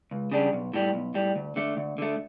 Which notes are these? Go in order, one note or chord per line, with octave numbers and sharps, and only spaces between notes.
C#2
C#3 G3 D4
B1
A2 G3
B1
A2 G3
D2
D3 A3
D2
D3 A3